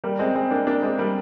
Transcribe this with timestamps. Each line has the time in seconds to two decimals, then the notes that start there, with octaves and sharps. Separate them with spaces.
0.04 G3 A#3
0.19 G#3 C4
0.36 G#3 C4
0.51 A#3 D4
0.67 A#3 D4
0.82 G#3 C4
0.98 G3 A#3